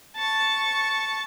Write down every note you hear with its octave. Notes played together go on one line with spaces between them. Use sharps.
A5 C#6